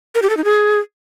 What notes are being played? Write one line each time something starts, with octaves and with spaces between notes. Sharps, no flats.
A#4
G4
A4
D#4
G#4